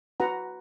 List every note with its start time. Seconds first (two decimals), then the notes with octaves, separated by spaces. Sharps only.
0.20 F#4 B4 F#5 A#5